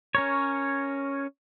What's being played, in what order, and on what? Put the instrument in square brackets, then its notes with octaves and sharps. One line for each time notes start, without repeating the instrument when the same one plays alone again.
[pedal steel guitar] C#4 A#4 C#5